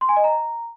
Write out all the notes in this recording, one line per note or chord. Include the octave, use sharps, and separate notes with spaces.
C6
G#5
D#5
A#5